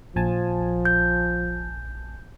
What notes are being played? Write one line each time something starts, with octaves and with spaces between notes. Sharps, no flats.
A#1 F3 G#5 A5
G6